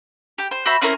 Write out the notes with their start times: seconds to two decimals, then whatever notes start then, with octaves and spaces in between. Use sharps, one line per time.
0.38 G4
0.51 C5
0.66 F#4 C5 E5 B5
0.82 C4 C#4 E4 A#4